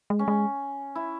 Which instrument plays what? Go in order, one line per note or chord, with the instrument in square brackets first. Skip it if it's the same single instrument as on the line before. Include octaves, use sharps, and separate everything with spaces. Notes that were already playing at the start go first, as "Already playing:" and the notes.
[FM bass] G#3
[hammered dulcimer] C#4
[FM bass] G#3
[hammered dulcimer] E4